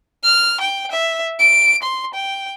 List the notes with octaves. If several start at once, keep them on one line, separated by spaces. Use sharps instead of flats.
F6
G5
E5
D7
C6
G5